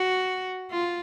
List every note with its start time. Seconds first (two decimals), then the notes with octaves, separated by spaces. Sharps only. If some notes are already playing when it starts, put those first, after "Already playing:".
Already playing: F#4
0.71 F4